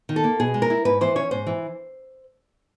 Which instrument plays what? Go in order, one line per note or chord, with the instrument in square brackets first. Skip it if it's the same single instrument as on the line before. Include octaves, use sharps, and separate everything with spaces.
[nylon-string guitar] D#3
A4
A#3
B2 G#4
G#3
A#4
E4
G#2 B4
E3 C5
C#4 C#5
G#2 C5
E3